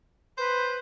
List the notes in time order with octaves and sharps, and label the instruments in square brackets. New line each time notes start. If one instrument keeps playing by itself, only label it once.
[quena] B4 [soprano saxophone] C5